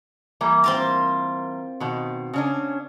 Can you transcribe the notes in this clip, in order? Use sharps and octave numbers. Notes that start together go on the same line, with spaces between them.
E3 G3 A#3
C4 F4 A#4
B2 D#3
C#3 C#4 D4